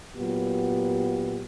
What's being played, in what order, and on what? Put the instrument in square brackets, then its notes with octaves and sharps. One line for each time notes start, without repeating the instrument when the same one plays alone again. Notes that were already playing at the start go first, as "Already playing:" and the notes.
[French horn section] A#2 F#3 B3 F4 G4